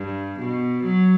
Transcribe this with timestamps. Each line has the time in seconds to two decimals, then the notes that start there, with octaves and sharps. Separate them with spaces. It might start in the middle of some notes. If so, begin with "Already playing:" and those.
Already playing: G2
0.38 B2
0.84 F#3